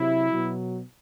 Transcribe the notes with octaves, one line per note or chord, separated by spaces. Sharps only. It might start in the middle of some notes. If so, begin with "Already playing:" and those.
Already playing: C3 F#3 E4
B2 F#3